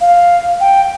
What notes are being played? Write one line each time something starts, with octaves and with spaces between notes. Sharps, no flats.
F5
G5